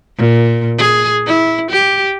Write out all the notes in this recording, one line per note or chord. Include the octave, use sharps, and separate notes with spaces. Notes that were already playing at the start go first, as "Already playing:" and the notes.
A#2
G#4
E4
G4